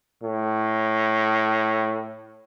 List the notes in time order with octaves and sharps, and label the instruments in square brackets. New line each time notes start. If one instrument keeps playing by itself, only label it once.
[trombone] A2